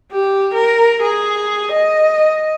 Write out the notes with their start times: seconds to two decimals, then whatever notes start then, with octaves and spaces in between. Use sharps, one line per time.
0.12 G4
0.54 A#4
1.03 G#4
1.72 D#5